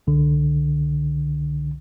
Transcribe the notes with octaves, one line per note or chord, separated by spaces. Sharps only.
C2 D3